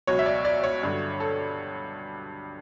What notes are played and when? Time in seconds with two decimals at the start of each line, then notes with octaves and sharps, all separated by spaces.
0.07 C#2 B2 F#3 C#5
0.19 E5
0.26 D5
0.45 D5
0.64 C#5
0.83 G2 D3 F#3
1.20 A4